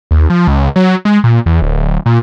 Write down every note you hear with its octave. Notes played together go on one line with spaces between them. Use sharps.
D#2
F3
C#2
F#3
G#3
A#2
E2
D1
A#2